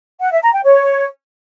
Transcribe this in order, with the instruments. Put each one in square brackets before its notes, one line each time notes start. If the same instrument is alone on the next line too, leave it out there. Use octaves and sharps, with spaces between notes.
[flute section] F#5
E5
A#5
G5
C#5